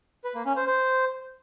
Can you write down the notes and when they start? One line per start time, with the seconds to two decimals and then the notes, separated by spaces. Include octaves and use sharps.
0.24 B4
0.35 A#3
0.46 C#4
0.56 C5
0.67 C5